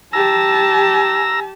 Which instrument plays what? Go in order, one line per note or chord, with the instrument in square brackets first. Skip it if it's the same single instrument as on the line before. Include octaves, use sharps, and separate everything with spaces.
[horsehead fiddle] G4 A5 [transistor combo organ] A#5 E6